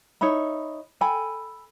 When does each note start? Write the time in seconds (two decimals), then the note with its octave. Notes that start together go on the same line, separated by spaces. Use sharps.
0.21 D#4 C#5 E5 B5
1.01 A4 G5 G#5 B5